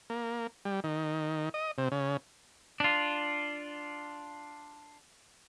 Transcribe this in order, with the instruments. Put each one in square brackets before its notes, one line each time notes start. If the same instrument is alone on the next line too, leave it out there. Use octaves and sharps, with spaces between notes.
[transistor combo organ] A#3
G3
D#3
D#5
C3
C#3
[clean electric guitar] D4 F4